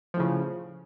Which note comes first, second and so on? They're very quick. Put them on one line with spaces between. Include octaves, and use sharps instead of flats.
F3 A2 C#3